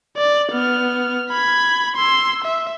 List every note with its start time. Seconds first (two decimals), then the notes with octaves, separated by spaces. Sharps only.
0.17 D5
0.52 B3 F6
1.31 B5 G#6
1.96 C6 E6
2.44 E5